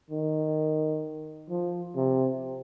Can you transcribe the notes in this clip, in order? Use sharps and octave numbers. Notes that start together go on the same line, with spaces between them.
D#3
F3
C3